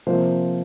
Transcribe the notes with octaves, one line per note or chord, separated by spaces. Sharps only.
C3 F3 A#3 C5